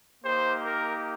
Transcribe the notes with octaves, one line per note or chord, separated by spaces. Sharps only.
A#3 D#4 G4 C5
A#4